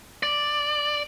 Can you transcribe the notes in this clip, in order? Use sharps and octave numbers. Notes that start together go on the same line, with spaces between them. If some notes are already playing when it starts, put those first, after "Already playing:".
D5